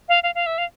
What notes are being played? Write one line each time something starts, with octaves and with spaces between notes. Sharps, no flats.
F5
F5
F5
E5
F5